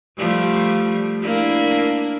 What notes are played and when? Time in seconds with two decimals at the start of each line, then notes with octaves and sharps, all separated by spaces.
0.18 F3 G3 A3
1.22 A#3 D4 E4